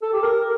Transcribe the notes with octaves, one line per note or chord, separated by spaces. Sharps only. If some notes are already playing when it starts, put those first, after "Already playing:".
A4
G4
A#4